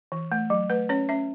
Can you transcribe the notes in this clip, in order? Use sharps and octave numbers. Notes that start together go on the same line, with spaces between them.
E3
A3
F#3
A3 B4
C#4 C#5
C#4 E5